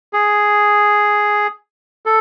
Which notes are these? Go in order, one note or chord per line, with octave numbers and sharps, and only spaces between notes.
G#4
A4